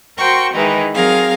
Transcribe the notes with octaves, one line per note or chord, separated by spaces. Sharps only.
F#4 A#4 C5 G5 C#6
D#3 E3 G#3 D#4 E4
F#3 C4 G#4 A#4 F5